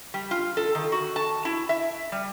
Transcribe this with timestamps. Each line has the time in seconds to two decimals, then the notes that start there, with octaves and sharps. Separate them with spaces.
0.14 G3
0.31 F4
0.57 A4
0.75 D#3
0.92 F#4
1.16 A5
1.45 E4
1.69 E5
2.12 G3